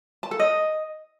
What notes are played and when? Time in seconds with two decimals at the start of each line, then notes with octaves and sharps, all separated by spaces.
0.23 A5
0.31 A4
0.39 D#5